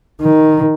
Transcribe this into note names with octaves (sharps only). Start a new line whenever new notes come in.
D#3